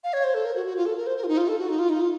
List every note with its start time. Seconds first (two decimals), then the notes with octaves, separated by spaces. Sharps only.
0.04 F5
0.13 C#5
0.24 C5
0.34 A4
0.45 A#4
0.56 F#4
0.66 F#4
0.77 F4
0.86 A4
0.97 A#4
1.07 C5
1.17 A#4
1.24 F4
1.28 D#4
1.38 F4
1.48 A4
1.59 F#4
1.69 D#4
1.79 F4
1.90 D#4
2.00 F4